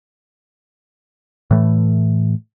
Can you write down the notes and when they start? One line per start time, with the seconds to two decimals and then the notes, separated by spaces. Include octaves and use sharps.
1.51 A2 E3 A3